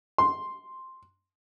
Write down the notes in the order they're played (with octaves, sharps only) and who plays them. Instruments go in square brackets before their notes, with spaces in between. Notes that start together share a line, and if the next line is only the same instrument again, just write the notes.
[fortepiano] C6